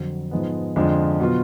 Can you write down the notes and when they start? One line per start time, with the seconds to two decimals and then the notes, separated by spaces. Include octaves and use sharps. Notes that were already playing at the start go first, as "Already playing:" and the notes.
Already playing: F2 D3 F#3
0.31 G#2 F3 G#3 B3
0.76 F2 D3 G#3 D4 F4
1.20 B2 F#3 B3 F4